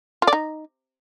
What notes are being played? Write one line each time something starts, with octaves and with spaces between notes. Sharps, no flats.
F4
D5
D#4